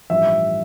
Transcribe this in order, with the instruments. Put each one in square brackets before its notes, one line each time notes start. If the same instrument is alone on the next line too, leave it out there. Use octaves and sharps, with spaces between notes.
[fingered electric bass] A1 G2 F3 [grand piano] E5